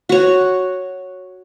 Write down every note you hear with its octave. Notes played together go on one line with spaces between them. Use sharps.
F#4 C#5